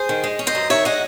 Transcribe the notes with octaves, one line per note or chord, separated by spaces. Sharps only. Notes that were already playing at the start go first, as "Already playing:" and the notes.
Already playing: G#4 C5
D#3
G#3
C#4
C5 D#5
F#2
D#3 C#5 E5
G#3 D#5 F#5